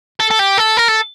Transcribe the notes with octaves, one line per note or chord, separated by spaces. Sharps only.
A4
A4
G4
A4
A#4
A4